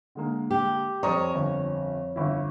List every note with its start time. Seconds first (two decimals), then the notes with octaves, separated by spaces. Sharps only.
0.15 D3 G#3 A#3
0.51 G4
1.03 F2 C#5 D5 A#5 D#6
1.34 G1
2.16 G1 E4